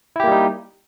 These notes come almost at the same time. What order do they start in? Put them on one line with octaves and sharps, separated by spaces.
E4 G4 A#3 G3 D#4